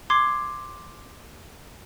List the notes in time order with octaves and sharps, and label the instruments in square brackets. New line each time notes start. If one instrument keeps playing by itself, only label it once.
[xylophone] C6 D6 G#6 C7